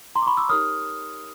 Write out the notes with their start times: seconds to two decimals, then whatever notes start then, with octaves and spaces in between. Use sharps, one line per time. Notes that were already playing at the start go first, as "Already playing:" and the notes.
0.15 A#5 C6
0.22 D6
0.26 B5 C#6
0.37 D6 E6
0.49 D#4 G4 A#4 C#5 D#6 F6